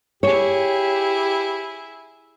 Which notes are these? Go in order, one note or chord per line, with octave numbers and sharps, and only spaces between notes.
E4 G4 G#4 C#5